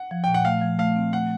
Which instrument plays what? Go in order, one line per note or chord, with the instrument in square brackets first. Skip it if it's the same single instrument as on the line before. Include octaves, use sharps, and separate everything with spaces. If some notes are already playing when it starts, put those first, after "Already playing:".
Already playing: [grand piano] F#5
[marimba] F3
[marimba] A#2 [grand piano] G5
[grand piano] F#5
[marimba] A3 [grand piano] F5
[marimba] F3
[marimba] A3 [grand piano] F5
[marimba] C4
[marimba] A3 [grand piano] F#5